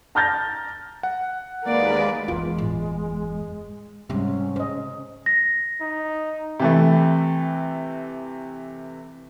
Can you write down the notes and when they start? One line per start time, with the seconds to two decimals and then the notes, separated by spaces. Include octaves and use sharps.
0.15 A5 A#5 F6 G6 A6 A#6
1.03 F#5
1.64 D#2 G#3 A#3 B4 D5
2.28 F#1 E2 G#3 B3 F4
2.58 A2
4.10 G#2 C3 G3 G#3 C#4
4.56 C#3 C5 D#5
5.26 A#6
5.81 D#4
6.60 C3 E3 A3